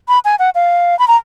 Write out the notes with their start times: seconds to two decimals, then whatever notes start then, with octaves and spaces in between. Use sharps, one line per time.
0.08 B5
0.25 G#5
0.39 F#5
0.55 F5
0.99 B5
1.08 A#5